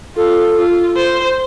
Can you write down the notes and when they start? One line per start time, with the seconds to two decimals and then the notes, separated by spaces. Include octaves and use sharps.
0.16 F4 A4
0.57 F4
0.96 C5